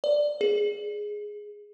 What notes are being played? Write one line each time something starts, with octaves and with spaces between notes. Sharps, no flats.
D5
G#4